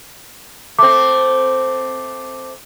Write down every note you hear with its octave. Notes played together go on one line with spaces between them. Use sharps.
A3 C4 D6